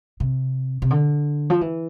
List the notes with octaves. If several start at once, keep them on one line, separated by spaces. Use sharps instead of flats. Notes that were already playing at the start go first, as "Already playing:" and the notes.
C3
C3
D3
F3
E3